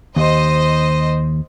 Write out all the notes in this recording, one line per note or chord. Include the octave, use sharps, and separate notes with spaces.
D#2 C5 D#5